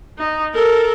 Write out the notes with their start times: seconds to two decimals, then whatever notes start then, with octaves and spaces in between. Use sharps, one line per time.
0.19 D#4
0.54 A4 A#4